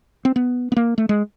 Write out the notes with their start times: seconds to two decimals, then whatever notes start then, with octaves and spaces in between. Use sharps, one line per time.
0.25 C4
0.36 B3
0.72 B3
0.77 A#3
0.98 A3
1.09 G#3